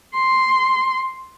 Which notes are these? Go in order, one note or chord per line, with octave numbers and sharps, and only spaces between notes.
C6